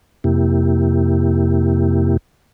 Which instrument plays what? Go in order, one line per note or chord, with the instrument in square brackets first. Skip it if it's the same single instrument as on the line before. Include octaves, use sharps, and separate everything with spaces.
[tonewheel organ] F2 C3 A#3 E4 G4